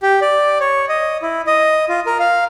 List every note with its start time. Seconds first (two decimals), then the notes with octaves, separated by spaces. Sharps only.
0.02 G4
0.22 D5
0.60 C#5
0.89 D#5
1.22 E4
1.47 D#5
1.89 F4
2.06 A#4
2.20 F5